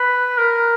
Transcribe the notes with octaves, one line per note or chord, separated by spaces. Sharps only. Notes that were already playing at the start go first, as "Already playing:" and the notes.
Already playing: B4
A#4